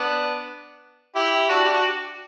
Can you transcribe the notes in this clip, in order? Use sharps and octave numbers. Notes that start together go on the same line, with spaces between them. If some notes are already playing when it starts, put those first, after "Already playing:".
Already playing: B3 D4
E4 G4
D4 F#4
G4
F#4